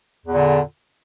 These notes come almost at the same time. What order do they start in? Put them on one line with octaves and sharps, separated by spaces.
E2 A#2 D3